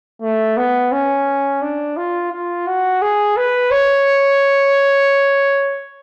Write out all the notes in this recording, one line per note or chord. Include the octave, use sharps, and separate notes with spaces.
A3
B3
C#4
D4
F4
F4
F#4
G#4
B4
C#5